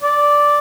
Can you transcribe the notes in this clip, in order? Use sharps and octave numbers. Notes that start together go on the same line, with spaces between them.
D5